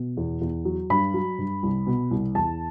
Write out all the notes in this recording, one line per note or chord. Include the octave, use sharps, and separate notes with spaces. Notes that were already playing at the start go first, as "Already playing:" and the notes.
Already playing: B2
E2
E2
F#3
G2 B5
F#3
G2
C2
B2
C2
E2 A5